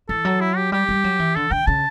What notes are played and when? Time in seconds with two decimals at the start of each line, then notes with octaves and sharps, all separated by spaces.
0.09 E3 A4
0.25 F#3
0.41 E4
0.56 G4
0.72 G3 G4
0.89 G3
1.04 F#3
1.19 E3
1.35 D3 A4
1.51 D3 G5
1.67 C#3 A5